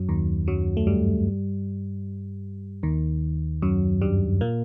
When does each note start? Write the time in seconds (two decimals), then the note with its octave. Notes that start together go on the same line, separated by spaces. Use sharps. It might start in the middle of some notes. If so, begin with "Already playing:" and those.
Already playing: F#2 F#3
0.09 D#2 D#3
0.48 F#2 F#3
0.77 A3
0.87 G2 G3
2.83 D#2 D#3
3.62 F#2 F#3
4.02 G2 G3
4.41 A#2 A#3